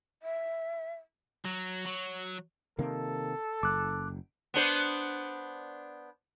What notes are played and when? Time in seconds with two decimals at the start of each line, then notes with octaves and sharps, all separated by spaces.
0.23 E5
1.45 F#3
1.86 F#3
2.79 C3 D#3 A#3 A4
3.63 F#1 D6 F#6
4.54 B3 D4 C5